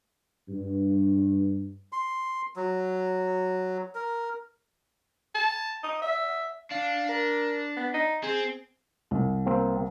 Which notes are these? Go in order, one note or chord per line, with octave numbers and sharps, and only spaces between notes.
G2
C6
F#3
A#4
A5
D#5
E5
D4 F5
A#4
B3
D#4
C4 G#4
C2
A#3 C4